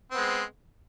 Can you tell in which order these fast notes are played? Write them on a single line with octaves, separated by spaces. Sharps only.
C4 B3 G#3